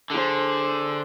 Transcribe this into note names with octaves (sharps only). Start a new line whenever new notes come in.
D3 G#4 C5